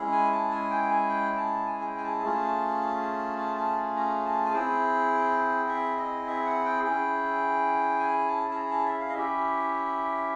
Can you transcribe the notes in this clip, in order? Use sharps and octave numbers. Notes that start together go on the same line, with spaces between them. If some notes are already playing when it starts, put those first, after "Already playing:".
Already playing: G#3 C#4 E4 G#4
G#5
A5
G#5
G5
G#5
G5
A5
G#5
G#5
G5
G#5
A5
A3 C#4 F4 G#4
A5
A5
A#5
A5
G#5
C4 E4 G#4 G5
E5
D#5
E5
F#5
G5
C#4 E4 G#4
G#5
A5
A5
A#5
A5
E5
F5
D#5
C#4 E4 G4 E5